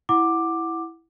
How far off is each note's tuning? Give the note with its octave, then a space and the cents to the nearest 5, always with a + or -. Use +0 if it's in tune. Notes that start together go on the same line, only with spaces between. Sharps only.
E4 +0 F#5 +0 D6 +10